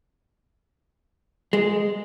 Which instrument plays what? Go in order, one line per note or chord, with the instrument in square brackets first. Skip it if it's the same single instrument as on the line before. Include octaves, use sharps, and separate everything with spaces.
[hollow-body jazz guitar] G#3